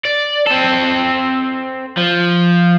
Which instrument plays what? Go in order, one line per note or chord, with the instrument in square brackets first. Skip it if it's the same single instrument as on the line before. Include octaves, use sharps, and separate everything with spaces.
[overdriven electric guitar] D5
C4 A4
F3